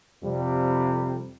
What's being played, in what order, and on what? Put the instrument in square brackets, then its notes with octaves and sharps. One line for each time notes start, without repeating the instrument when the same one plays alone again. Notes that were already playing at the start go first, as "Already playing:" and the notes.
[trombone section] F2 C3 G3